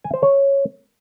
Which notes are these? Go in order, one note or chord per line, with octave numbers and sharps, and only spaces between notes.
G#5
C5
C#5